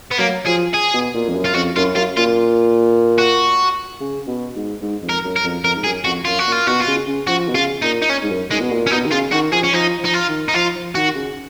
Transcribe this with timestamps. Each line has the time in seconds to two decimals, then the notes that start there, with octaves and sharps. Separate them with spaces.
0.11 B3
0.18 F#3 A#3
0.46 F3 G#4
0.74 G#4
0.94 B2
1.14 A#2
1.28 F2
1.35 F#2
1.45 F4
1.55 F2 F#4
1.76 F#2 F4
1.96 F#2 F4
2.16 A#2 F4
3.18 F#4
4.00 C#3
4.27 B2
4.55 G#2
4.82 G#2
5.03 F2
5.09 A#4
5.24 F#2
5.36 A#4
5.43 F2
5.63 F2 A#4
5.76 G#2
5.84 F#2 G#4
6.05 F2 F#4
6.25 F#2 F4
6.39 F#4
6.46 A#2
6.52 F4
6.67 B2 F#4
6.80 F4
6.87 C#3
7.07 C#3
7.27 F3 F#4
7.48 B2
7.55 C#3 F4
7.82 A#2 D#4
8.02 D#4
8.09 C#4
8.23 G#2
8.30 F#2
8.51 G#2 G#3
8.61 B2
8.71 A#2
8.87 C#4
8.91 B2 D#4
9.05 D#3
9.11 C#3 F4
9.33 D#3 F#4
9.52 F3 G#4
9.64 C#4
9.73 F3 D#4
10.00 F3
10.05 D#4
10.14 F4
10.28 D#3
10.48 D#4
10.54 F3 F4
10.76 F3
10.95 D#3 F#4
11.16 C#3